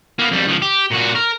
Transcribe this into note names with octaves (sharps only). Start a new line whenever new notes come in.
A#3 B3
F2 G3
C#2 F3
G4
A#2 F#4
A#4